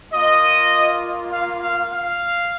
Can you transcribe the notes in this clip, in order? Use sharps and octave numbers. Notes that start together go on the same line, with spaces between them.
A#3 F4 D#5
F5
F5
F5